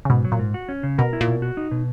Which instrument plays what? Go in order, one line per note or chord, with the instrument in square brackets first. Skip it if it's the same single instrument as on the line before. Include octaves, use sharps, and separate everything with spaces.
[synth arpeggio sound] C#3
[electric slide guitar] G#2 [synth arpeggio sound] B2
[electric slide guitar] F#3
[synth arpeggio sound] A#2
[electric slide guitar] G#2
F#4
C#4
C#3
[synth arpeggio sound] B2 [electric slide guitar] A#4
[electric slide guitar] E4
[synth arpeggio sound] A#2
[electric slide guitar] B2
F#4
D#4
B2